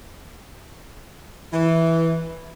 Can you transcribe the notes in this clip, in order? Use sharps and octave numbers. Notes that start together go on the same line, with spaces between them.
E3